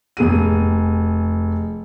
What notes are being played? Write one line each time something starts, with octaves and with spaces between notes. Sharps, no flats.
F1 G#4 D#7